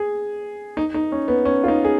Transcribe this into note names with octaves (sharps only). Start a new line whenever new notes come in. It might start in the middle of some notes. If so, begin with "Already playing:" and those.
Already playing: G#4
D#4
D#4
C#4
B3
C#4
F4
D#4
G#4